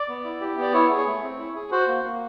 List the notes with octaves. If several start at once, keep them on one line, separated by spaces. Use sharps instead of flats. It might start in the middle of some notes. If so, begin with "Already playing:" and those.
Already playing: D5
B3
E4
G4
B3 D5
E4 C#5
G#4
C#5
A3
C4
E4
G#4
F#4 C5
A#3
A#3